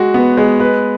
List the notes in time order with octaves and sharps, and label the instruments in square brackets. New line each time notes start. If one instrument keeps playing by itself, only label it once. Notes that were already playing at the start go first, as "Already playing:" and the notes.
Already playing: [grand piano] G#3 F#4
B3
G#3
B4